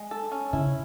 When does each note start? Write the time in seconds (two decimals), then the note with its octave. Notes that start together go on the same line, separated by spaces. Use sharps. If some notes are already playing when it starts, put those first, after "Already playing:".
Already playing: G#3
0.11 A4
0.32 C#4
0.53 C#3 E4